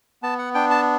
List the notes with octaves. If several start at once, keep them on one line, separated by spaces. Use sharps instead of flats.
B3 A5
F#5
D4 G5
A5